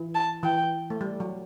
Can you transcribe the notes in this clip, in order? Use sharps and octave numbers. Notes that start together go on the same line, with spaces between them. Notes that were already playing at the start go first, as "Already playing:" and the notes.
Already playing: E3
A5
E3 G5
A3
G3
F#3